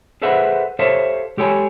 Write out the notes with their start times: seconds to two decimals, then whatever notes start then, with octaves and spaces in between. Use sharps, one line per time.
0.22 G#4 A4 B4 C5 E5 F#5
0.79 G4 A4 C5 C#5 E5 F5
1.37 G#3 G4 A4 C#5 G#5